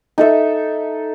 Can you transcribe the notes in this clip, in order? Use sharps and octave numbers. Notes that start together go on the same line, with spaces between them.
D#4 A4 E5